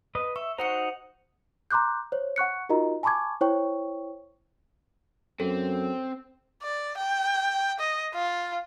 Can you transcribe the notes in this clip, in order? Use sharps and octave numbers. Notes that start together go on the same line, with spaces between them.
B4 D#5
E5 C#6
D#4 F#4 C5 F#5 A#5 C#7
A#5 C6 D6 F#6 G6
C5 C#5
F#5 C#6 F#6 C#7
D#4 F4 F#4 A#4 D#5 A#5
G#5 A5 B5 C#6 D6 G#6
E4 C5 C#5 G5 C#6
F#2 C4 A4
D5
G5
D#5
F4